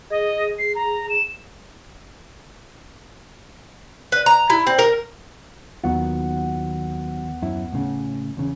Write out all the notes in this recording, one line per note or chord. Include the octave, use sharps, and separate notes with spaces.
G#4 D#5
C7
A#5
E7
B4
A#5
E4
C4
A#4
D#2 D#3 F#3 B3 F4 F#5
F#2 E4
A2 C#3
E2 C#3